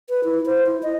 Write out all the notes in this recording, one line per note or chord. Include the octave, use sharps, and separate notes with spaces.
B4
E4
C5
E4
D#5